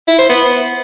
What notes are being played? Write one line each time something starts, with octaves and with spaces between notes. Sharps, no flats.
E4
C5
B3